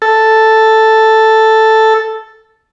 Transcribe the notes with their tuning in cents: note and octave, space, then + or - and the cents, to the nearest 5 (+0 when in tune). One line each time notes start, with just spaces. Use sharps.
A4 +0